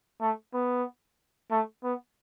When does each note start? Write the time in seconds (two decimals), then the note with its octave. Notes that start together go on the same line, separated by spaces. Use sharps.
0.21 A3
0.54 B3
1.51 A3
1.83 B3